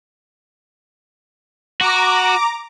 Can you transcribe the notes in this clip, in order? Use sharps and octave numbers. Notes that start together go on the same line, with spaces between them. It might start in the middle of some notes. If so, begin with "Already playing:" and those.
F#4 A#5 D6